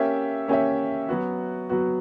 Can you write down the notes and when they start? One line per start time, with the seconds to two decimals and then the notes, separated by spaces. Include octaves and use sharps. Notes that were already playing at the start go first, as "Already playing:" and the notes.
Already playing: A#3 C#4 G4 C#5 E5
0.48 A#3 C#4 G4 C#5 E5
1.09 F#3 B3 F#4
1.69 F#3 B3 F#4